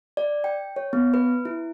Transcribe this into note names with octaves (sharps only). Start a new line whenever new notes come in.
D5
G5
C#5
B3
B4
E4